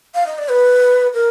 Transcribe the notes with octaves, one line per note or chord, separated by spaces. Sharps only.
F5
D#5
D5
B4
A#4